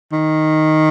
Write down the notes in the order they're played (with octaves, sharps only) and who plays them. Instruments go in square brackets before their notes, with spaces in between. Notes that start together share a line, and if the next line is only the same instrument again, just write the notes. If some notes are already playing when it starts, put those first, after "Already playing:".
[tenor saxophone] D#3